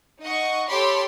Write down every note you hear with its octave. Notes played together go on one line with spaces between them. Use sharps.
D#4 D#5 F#5 C#6
G4 A4 C#5 B5 C6 D6